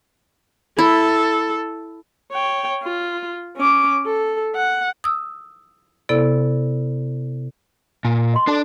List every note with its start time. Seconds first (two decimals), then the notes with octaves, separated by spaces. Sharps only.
0.79 E4 A4
2.33 C#5 G5
2.83 F4
3.57 C#4 D6
4.06 A4
4.56 F#5
5.04 D#6 E6
6.09 C3 B3 E4 A4 D5
8.05 A#2 G#5
8.34 D#5 B5 C6
8.47 D4 A4 D5 A5